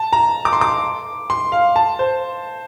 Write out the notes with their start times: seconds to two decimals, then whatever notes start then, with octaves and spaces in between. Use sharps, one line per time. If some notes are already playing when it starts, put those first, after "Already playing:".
Already playing: A5
0.13 A#5
0.45 D6
0.53 C6
0.61 D6
1.30 C6
1.52 F5
1.76 A5
1.99 C5